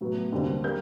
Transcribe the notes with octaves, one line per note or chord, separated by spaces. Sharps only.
A2 F#3 B3
D#2 D3 G3 C4
G3 A#3 G6